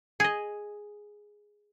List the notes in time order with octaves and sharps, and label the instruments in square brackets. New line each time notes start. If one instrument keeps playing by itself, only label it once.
[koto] G#4 D#5